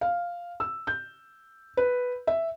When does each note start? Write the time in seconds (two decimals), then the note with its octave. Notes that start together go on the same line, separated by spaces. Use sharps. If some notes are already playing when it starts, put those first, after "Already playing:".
0.01 F5
0.60 E6
0.87 G6
1.77 B4
2.27 E5